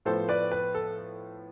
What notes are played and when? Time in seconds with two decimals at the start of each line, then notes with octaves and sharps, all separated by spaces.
0.05 A2 F3 B3 A4 C5
0.29 B4 D5
0.52 B4
0.75 A4